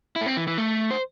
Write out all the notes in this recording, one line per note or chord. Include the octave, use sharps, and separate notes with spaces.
E4
A3
C4
E3
E3
A3
C5